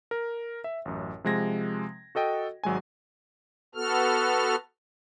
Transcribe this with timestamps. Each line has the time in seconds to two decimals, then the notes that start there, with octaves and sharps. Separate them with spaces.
0.11 A#4
0.64 E5
0.85 A1 F#2
1.24 C3 F3 G#3 G#6 A#6
2.15 F#4 A4 D#5 G5
2.64 G#1 F#3 G#3 G#5
3.75 B3 F#4 A4 F6